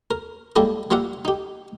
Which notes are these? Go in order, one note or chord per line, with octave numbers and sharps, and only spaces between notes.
A#4
G3 G#3 A#3 E4 G4 A4
G3 A#3 F4 G4 E5 F#5
D#4 G4